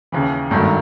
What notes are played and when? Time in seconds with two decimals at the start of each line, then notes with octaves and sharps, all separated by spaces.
0.12 D#2 C#3 E3
0.51 G#1 G2 D#3 F#3 A3